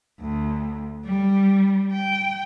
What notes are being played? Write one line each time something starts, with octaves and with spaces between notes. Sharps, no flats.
D2
G3
G5